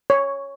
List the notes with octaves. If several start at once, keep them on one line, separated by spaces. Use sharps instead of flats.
C#5